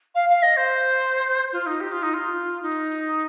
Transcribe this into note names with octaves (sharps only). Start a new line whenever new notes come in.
F5
F5
D#5
C5
F4
D#4
G4
F4
D#4
F4
D#4